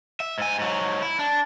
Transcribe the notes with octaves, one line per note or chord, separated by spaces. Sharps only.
E5
G#2 G#5
G#2 F#3
E4
D4